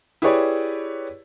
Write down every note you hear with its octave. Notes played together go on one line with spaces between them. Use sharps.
E4 G4 G#4 B4 C#5 D5